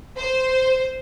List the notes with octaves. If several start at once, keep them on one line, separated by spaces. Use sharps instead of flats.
C5